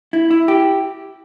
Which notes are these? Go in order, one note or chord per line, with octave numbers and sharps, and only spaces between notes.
E4
E4
G4